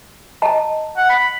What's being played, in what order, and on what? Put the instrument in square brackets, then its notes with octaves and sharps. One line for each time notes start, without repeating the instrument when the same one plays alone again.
[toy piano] D#5 A5 A#5
[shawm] F#5
B5